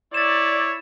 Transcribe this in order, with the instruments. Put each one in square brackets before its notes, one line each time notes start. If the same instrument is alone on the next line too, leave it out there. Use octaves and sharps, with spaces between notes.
[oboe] E4 [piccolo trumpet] C#5 [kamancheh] D5 [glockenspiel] A6 E7